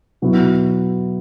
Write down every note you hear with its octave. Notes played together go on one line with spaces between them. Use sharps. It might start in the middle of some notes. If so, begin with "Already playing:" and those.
B2 F#3 B3 E4